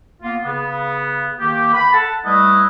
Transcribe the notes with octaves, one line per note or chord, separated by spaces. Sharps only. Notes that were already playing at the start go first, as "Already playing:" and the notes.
A#3 B3 F4
C#3 B3
D#3 A#3 G4
B5
A4 F#5 A5
G3 A3 E4 B4 D#5